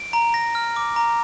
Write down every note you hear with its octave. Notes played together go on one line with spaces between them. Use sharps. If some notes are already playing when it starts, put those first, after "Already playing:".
Already playing: D7
A#5
A#5 A#6
F6
D6
A#5